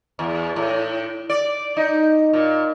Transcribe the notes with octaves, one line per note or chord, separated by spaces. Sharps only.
E2
A2
D5
D#4
A#2